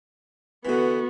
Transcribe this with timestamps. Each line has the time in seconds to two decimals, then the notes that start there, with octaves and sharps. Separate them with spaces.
0.65 D3 E3 B3 F#4